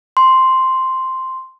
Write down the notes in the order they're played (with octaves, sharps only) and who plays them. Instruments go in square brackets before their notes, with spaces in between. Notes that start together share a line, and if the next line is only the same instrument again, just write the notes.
[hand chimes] C6